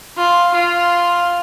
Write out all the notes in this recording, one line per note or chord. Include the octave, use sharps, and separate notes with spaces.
F4
F4